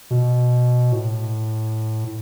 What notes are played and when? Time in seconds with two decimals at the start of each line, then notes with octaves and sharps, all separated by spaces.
0.10 B2
0.92 A2